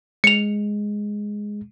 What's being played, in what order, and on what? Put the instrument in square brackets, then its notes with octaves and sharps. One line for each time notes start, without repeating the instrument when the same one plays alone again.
[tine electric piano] G#3 [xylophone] C#7 F7